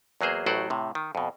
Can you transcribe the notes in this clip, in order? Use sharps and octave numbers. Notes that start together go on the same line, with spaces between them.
E2 F#3 A#3 G#4 C5
A1 A2 F#3 C5 D5 F#5
A2 C3
D#3
F2 B2